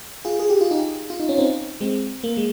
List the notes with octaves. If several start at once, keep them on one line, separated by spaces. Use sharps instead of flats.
F4 G#4
G#4
G4
F4
D#4 G4
F4
D#4
C#4
C4 D#4
G#3 C4
A#3
G#3